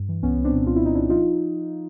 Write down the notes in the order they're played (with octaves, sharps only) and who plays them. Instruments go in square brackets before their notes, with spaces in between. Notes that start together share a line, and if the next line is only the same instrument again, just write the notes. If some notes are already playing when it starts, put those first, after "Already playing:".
Already playing: [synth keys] G2
E3
C2 B3 C#4
C2
C4 D4
A#2
C2 F4
E4
A#2 D#4
C2 D4 E4
F3 D#4 F4